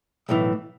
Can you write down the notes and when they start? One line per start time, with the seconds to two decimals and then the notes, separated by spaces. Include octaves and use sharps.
0.29 B1 A2 E3